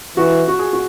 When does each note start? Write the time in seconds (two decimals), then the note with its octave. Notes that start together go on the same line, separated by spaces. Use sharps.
0.17 E3 F#4
0.48 F#4
0.59 G#4
0.73 F#4